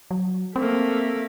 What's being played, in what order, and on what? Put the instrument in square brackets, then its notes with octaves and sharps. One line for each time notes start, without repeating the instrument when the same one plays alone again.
[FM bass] F#3
[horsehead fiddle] A3 A#3 [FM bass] C4